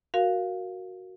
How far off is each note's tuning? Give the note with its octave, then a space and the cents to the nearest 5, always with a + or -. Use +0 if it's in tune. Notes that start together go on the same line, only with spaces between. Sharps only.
F#4 +0 A#4 +0 F5 +0